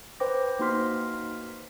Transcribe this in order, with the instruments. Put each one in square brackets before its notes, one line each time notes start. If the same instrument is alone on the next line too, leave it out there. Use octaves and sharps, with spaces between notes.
[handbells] B4 C5 G5 D6 A#6
A#3 D#4 F#4 C6 F6 B6